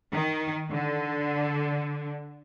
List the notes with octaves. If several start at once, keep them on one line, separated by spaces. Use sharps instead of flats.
D#3
D3